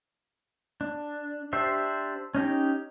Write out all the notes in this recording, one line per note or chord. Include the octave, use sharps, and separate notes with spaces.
D4
D4 G4 C5 E5
C#4 D#4 G4